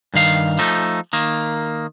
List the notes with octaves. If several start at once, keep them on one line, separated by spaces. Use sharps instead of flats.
G2 D#3 F5
F3 A3 D#4
D#3 A#3